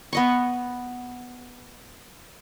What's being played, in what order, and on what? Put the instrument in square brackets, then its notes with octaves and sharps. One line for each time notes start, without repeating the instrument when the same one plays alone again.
[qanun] B3 D#5 C#6